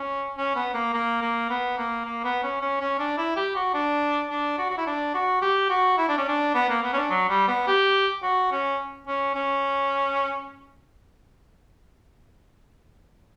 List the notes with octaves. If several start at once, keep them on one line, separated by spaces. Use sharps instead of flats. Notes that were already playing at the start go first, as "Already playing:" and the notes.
Already playing: C#4
C#4
B3
A#3
A#3
A#3
B3
A#3
A#3
B3
C#4
C#4
C#4
D4
E4
G4
F#4
D4
D4
F#4
F#4
E4
D4
F#4
G4
F#4
E4
D4
C#4
D4
B3
A#3
B3
C#4
D4
F#3
G3
B3
G4
F#4
C#4
C#4
C#4